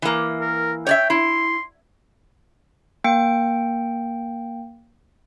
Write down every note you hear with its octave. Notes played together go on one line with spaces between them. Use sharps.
E3 A#3
A#4
C#5 D5 E5 G5
E4 C6
A#3 G5 C#7